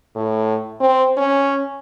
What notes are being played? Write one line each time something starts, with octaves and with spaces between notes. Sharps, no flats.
A2
C4
C#4